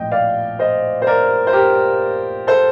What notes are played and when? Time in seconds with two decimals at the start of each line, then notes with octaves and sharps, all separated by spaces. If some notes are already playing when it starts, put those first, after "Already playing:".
Already playing: A#1 A2 F3 D#5 G5
0.12 D5 F5
0.59 C5 D#5
1.02 C5
1.07 A#4 D5
1.47 C5
1.53 G4 A#4
2.47 A4 C5